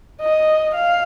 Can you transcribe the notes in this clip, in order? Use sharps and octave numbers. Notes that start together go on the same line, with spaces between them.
D#5
F5